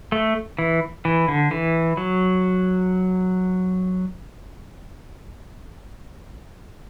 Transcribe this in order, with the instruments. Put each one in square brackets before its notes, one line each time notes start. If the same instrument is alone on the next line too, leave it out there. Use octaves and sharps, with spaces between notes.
[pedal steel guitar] A3
E3
E3
D3
E3
F#3